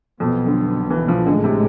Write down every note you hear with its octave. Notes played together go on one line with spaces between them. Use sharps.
B1 F2 B2 B3
D3
E3
F3
A1 A2 D3 G#3
C3